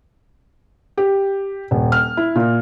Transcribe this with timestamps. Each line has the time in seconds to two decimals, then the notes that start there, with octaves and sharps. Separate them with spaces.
0.97 G4
1.71 D#1
1.92 F6
2.17 E4
2.35 A#2